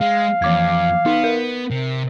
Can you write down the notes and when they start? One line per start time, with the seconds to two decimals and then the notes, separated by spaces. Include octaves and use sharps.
0.01 G#3 F5
0.42 F2 E3 D6 G#6
1.06 B3 D#4
1.24 A#4
1.71 C3